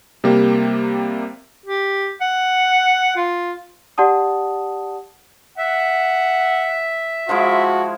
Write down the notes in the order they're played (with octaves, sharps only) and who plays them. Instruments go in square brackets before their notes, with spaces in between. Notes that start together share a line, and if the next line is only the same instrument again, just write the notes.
[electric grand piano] C3 G3 A#3 G4
[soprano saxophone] G4
F#5
F4
[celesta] G4 D5 F#5 A5 D#6
[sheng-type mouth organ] E5 [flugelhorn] F#5
[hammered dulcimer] F3 G#3 E4 [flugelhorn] F#4